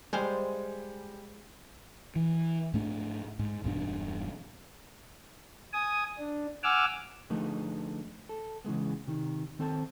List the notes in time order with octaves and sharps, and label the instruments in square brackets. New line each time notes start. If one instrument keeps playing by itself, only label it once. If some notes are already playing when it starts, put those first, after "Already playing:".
[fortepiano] G3 G#5 [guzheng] G#3 C5 F5
[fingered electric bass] E3
G#2 A3 D4
G#2
E1 G2 B2 D4
[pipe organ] G#5 D#6
D4
F#5 G#5 D6 E6 F6
[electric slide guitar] D3 F3 A3 D#4 G#4 B4
A4
C#3 E3 G#3 B3
C3 D#3
D#3 C4 A4 C5 G#5 A5